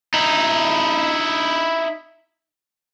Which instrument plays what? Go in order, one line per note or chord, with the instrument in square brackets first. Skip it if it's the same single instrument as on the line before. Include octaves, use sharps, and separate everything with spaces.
[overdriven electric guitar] D#4 E4